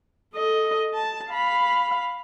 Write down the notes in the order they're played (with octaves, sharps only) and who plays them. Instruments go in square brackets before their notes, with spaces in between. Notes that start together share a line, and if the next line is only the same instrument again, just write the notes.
[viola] A4 D#5
A5
F5 B5